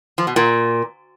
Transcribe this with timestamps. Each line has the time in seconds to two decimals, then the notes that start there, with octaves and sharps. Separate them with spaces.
0.18 F3
0.27 B2
0.36 A#2